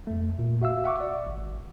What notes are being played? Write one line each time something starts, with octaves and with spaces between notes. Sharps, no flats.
F2 A3
A#2
F#4 E5 F5 E6
E5 F#5 C#6 D6
D5
G#1